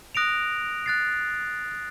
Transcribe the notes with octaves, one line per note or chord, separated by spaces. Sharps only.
D#6 F#6 A#6 D7 F7
F#6 A6 C7